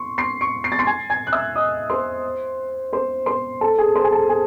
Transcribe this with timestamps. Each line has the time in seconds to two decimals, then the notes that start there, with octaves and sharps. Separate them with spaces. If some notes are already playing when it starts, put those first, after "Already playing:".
Already playing: C6 C#6
0.18 C6 C7
0.41 C#6 C#7
0.64 C7
0.72 A6
0.79 C6 C7
0.87 G#5 G#6
1.10 G#5 G#6
1.27 F#6
1.32 E5 E6
1.56 D#5 D#6
1.90 C5 C6
2.93 C5 C6
3.26 C5 C6
3.61 A4 A5
3.78 G#4 G#5
3.95 C5 C6
4.04 G#5
4.12 A4 A5
4.29 G#4 G#5